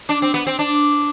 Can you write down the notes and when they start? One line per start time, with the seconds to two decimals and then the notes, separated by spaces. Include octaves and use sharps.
0.09 D4
0.22 C4
0.34 B3
0.47 C4
0.59 D4